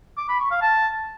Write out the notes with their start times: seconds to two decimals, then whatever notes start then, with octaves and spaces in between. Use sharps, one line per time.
0.18 D6
0.29 B5
0.40 C#6
0.51 F5
0.62 A5